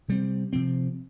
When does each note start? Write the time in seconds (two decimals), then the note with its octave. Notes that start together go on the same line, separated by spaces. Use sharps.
0.08 C3 G3 C4
0.53 C3 F3 C4